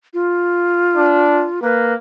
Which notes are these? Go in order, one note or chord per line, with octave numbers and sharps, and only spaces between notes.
F4
D4
A#3 B4